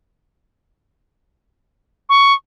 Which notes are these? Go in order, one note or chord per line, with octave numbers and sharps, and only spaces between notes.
C#6